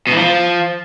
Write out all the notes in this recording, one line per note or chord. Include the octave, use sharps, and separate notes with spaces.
B2
E3
F3